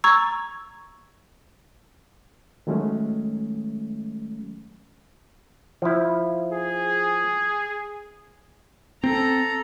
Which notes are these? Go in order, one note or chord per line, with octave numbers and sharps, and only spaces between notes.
A#5 C#6 E6 G#6 A6
D#3 F#3 G#3 A3 C#4
F3 E4
G#4
C4 A4 A#5